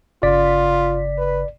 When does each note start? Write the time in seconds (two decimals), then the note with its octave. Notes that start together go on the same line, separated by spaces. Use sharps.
0.23 G1 C#3 F4 D5 B6
1.18 B4